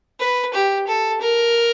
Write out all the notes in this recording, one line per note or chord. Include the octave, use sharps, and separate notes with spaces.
B4
G4
A4
A#4